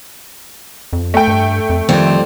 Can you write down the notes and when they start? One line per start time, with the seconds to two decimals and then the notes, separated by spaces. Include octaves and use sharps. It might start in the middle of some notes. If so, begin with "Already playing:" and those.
0.93 F2
1.14 A3 G5
1.28 G2
1.70 F2
1.89 F2 D#3 G3 C4